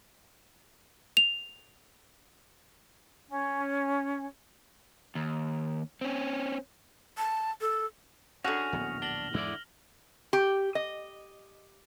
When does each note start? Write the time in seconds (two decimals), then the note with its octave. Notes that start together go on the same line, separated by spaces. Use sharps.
1.17 F7
3.28 C#4
5.15 D#2
6.01 C4 C#4
7.18 A5
7.61 A4
8.44 D3 C#4 F#4 G#4 F6 A#6 F7
8.73 D1 A#1 B3
9.02 D4 A#6 F#7 G7
9.34 E2 G#2 D3 E4 D5
10.33 G4
10.75 D#5